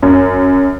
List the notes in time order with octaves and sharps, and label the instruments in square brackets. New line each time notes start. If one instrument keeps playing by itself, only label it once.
[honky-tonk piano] F#2